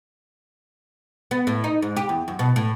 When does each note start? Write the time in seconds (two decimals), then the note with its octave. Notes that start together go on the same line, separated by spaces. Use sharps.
1.31 B3
1.47 A2
1.64 D#4
1.82 G#2
1.97 G4
2.09 E2
2.28 F#2
2.39 B2
2.56 A2